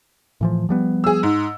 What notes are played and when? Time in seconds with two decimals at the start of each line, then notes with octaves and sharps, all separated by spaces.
0.41 A2 E3 F3
0.69 F3 G3 B3
1.04 G#4 E6
1.23 G#2